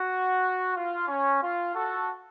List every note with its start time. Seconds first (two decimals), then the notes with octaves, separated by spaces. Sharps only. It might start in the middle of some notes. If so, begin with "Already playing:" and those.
Already playing: F#4
0.74 F4
1.07 C#4
1.42 F4
1.74 F#4 A4